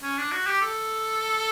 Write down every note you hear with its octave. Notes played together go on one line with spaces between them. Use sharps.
C#4
D4
F#4
G4
A4